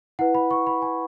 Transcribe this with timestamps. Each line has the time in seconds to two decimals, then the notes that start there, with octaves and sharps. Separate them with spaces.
0.19 E4 B4 F#5
0.35 B5
0.51 C#6
0.67 B5
0.82 G#5